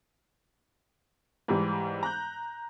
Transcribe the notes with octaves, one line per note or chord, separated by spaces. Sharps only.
G#2 E3 G3
A#5 F#6 G6